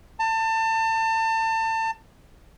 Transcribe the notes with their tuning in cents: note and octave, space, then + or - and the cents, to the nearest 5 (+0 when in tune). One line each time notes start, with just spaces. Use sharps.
A5 +30